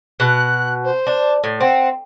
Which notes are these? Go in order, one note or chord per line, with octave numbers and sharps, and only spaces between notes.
B2 F#6
C5
D4
A2
C4 F#5